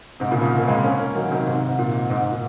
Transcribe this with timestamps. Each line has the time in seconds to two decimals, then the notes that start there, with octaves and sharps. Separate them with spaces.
0.20 G#2 C3
0.31 A#2 C#3
0.41 C#3 F3
0.58 A#3
0.68 G#3 C4
0.83 A#3 C#4
0.99 A#3 C#4
1.15 D#3 F#3
1.31 C3 D#3
1.47 G#2 C3
1.68 G#2
1.78 A#2
2.10 G#2
2.20 G#2
2.32 A#2